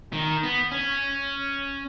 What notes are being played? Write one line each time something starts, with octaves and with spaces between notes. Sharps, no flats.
D#3
B3
C#4